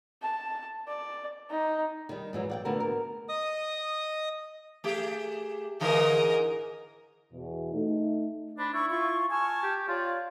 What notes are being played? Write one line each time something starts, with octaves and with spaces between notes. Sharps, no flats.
A5
D5
D#4
D#3 G3
G#2 E3 F#3
D5 F#5 G5
A2 D3 B3 F#4 A#4 B4
A#4
D#5 D#6
A3 G4 G#4
G#2 D3 E3 A#4 D#5
E2 B2
A3 D#4
D4 C5 B5
E4 C#6
F4 C#6
G#5 A5 C#6 F6
G4
F4 C#5 D5